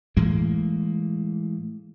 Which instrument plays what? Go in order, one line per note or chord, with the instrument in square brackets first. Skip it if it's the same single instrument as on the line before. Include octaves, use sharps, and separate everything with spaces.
[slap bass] A2 E3 G#3 A#3